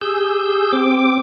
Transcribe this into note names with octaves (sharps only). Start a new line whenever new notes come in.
G4 G#4 E6 G6
C4 D6